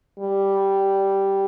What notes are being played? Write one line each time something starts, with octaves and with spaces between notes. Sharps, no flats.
G3